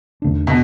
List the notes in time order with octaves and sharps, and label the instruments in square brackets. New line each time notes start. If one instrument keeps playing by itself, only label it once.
[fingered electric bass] E2 D3 A3 D4
[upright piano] B2